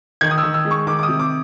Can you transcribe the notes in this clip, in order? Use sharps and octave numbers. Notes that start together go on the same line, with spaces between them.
D#3 G#6
D#6
E6
D#3
E6
G#3
C#6
D#3 D6
D6
D#6
C3
D6